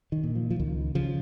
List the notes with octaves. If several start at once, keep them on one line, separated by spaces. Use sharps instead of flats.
D#3
A#2
F3
F3
C#2 D#3
C#3 F3